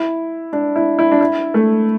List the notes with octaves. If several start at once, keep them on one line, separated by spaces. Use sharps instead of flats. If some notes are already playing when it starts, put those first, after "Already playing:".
Already playing: E4
D4
E4
E4
D4
E4
A3